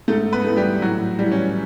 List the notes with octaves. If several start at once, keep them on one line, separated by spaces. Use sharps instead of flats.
G#2 A3 A4
B3 B4
E3 A3
G3 G4
A2 F#3 F#4
E3 G3
C#4